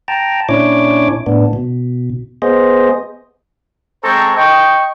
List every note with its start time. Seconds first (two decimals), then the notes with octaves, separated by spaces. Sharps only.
0.08 G5 A5 A#5
0.49 A#2 C#4 D4 E4 C#5 D6
1.26 A2 B3 D4
1.53 B2
2.42 B3 G#4 C5 D#5
4.03 G#3 C4 A4 C5 A#5 C#6
4.36 D#5 G5 C#6